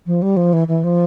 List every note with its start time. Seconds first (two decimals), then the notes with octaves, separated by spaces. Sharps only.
0.06 F3
0.22 G3
0.37 F3
0.53 E3
0.68 E3
0.84 F3